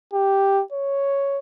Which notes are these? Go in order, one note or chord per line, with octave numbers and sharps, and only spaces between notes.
G4
C#5